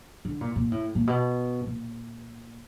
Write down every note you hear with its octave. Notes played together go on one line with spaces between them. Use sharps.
D3
A#2
A#2
A2
A#2
B2
A#2